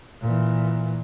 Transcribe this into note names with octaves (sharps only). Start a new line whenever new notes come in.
A#2 E3